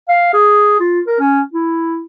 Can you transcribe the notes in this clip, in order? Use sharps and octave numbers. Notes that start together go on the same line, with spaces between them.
F5
G#4
F4
A#4
C#4
E4